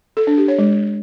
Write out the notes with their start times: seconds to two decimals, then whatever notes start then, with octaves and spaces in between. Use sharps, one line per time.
0.17 A4
0.27 D4
0.38 G4
0.48 C#5
0.59 G#3